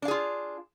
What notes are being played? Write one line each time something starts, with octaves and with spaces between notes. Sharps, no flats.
D4 F4 G#4 F5